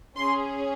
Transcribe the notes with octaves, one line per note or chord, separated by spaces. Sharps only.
C#4 G#4 C6